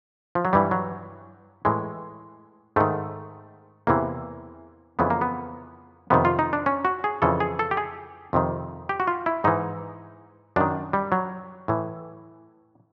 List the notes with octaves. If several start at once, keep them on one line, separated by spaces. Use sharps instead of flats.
F3
F#3
G2 E3 G3
F#3
A2 E3 G#3
G#2 D#3 A3
E2 C3 E3 A#3
F2 C#3 E3 B3
A#3
B3
F2 C3 D#3 B3
F4
D#4
D4
C#4
F#4
G#4
F2 C#3 E3 A4
G#4
A4
G4
G#4
F2 C3 D#3
G4
F#4
F4
E4
G#2 E3 D#4
F#2 D#3 D4
G3
F#3
A2 E3